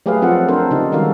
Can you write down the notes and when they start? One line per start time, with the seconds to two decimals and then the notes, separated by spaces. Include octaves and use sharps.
0.06 F#3 A3 G4 G#4 B4 F5
0.22 F3 C4 F4 A4 F#5
0.48 C4 D4 A4 A#4 C5
0.71 C#3 D#4 G4
0.92 D#3 G3 G#3 F#4 A4 F5